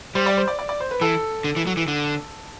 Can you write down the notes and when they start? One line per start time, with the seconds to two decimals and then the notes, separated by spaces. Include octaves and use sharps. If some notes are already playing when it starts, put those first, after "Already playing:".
0.15 G3 C5
0.26 D5
0.37 C5
0.48 D5
0.59 D5
0.69 D5
0.80 C5
0.91 B4
1.01 E3 A4
1.44 D3
1.56 E3
1.67 F#3
1.77 E3
1.88 D3